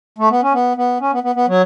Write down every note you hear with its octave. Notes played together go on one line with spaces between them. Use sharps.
A3
B3
C#4
B3
B3
C#4
B3
B3
B3
F#3